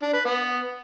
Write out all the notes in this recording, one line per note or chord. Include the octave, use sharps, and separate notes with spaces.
D4
B4
B3